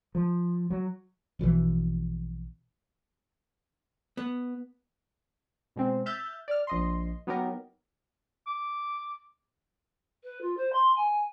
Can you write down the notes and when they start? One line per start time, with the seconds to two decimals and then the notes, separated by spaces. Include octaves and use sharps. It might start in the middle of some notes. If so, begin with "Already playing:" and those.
0.15 F3
0.70 F#3
1.39 A#1 B2 D3 E3
4.17 B3
5.76 B2 G#3 C4
6.06 E5 F6 G6 A6
6.48 D5 F6
6.67 A#1 D#5 C6
7.27 F#3 B3 D#4 G4 A#4
8.47 D6
10.23 B4
10.41 F4
10.57 C5
10.72 C6
10.95 G#5